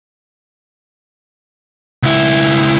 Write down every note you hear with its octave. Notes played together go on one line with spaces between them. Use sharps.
C#2 E4